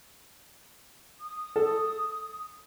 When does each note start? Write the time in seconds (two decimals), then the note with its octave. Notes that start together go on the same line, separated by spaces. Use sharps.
1.20 D#6
1.56 A4